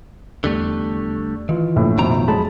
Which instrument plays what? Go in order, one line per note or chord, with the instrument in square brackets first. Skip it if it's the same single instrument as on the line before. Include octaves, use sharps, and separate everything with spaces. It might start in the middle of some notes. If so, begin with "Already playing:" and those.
[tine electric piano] E2 [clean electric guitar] D3 G3 A3
[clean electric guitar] D#3 [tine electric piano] E3 F4
[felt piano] A#1 A2
[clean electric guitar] B1 D#3 A#5 [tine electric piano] F2 B2 F3
[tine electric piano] F#3 A5 B5 [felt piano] G#3